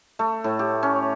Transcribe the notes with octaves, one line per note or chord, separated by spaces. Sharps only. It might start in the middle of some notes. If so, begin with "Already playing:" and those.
A3
A2
G4
C#4